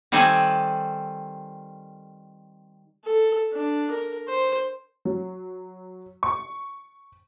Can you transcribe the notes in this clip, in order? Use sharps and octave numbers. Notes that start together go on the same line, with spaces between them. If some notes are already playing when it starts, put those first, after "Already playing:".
D#3 G3 C4 A4 G#5
A4
D4
A#4
C5
F#3
C#6